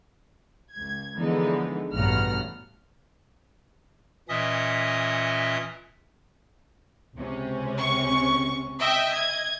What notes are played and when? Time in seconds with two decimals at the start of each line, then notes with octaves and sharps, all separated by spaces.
0.73 C#2 G#6
1.16 D3 E3 F3 G#3 B3 D#4
1.95 A1 G2 B2 F#5 A#5 F6
4.29 A#2 E3 C#4 D#5 E5 D#6
7.15 C#2 C3 C#4
7.76 C#6
8.80 D#5 E5 G5
9.11 D#5 G#6